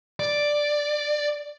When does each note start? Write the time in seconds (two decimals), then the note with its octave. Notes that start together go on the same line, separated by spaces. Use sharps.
0.20 D5